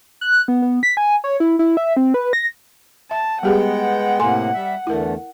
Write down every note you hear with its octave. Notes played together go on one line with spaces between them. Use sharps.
F#6
B3
B3
B6
G#5
C#5
E4
E4
E5
C4
B4
A#6
E5 A5
G3 G#3 B3 G4 G#4 F#5 G5
A2 C3 A#3 A4 G#5 C6
G3 E5
E2 D3 A3 E4 A#4